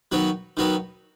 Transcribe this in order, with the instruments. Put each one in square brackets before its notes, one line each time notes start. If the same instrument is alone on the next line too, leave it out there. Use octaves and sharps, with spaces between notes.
[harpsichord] D#3 F#3 B3 F#4
D#3 F#3 B3 F#4